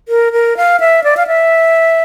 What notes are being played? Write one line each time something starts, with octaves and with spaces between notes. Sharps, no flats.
A#4
A#4
F5
E5
D5
F5
E5